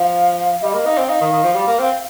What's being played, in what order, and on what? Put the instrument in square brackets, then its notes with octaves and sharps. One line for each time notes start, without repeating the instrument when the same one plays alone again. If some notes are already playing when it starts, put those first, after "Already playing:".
Already playing: [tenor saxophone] F3 [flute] F5
[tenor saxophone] G3 [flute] D#5
[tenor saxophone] A#3 [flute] D#5
[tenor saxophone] D#4 [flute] F5
[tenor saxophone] C4
[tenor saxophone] D#4 [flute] F5
[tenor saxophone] D#3
D#3
F3
G3
A#3
C4